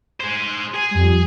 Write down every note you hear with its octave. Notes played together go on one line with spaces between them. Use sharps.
G#4 C5
G#4 G#5
F2 G3